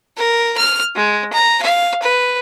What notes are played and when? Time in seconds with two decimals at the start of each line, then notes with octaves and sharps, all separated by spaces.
0.17 A#4
0.57 F6
0.95 G#3
1.33 A#5
1.62 F5
2.02 B4